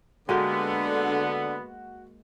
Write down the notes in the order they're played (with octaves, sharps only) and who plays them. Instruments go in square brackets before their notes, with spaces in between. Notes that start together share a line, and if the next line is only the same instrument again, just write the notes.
[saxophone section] D3 [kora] G#3 A#3 G4 [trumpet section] B3 [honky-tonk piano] F#4